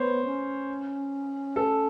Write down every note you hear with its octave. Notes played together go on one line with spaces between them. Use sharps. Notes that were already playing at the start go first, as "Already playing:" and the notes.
Already playing: B3 C5 C#5
C#4
A4